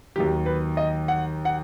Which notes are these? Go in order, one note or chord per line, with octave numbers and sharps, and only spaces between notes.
D#2 D#3 F#3 G4
B4
D#5
F#5
F#5